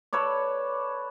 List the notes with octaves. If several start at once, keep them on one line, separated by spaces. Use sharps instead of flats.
A4 B4 C#5 D5